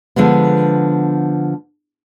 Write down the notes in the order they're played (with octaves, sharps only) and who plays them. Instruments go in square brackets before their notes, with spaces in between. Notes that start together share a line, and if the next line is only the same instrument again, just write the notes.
[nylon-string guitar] D3 F3 G#3 B3